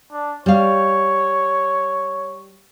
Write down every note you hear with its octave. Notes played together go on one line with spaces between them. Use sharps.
D4
G3 C#5 F5